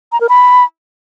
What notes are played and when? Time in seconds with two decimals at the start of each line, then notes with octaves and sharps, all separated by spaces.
0.12 A#5
0.21 A#4
0.29 B5